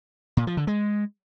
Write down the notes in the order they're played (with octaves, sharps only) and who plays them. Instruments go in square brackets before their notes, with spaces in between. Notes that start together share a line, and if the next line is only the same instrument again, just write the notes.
[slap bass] A#2
F3
D3
G#3